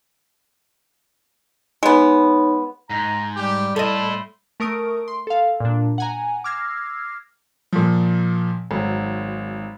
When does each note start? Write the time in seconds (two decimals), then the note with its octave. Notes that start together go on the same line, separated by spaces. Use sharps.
1.83 G#3 B3 D#4 C#5
2.90 G#2 A#5
3.37 G3 G4
3.76 A2 E4 A4 D#5 C6
4.60 A3 A#4 C#6 D#6 D7
5.08 C6
5.27 A4 F5
5.60 A#2 D4
5.98 F#5 G#5 A#5
6.44 D6 E6 F6 G#6 A#6 C7
7.73 A#2 F3
8.71 G#1 F#3